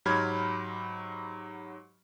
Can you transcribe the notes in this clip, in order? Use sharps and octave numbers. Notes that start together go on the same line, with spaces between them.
G#2 F#3 G4 B5 F6 G#6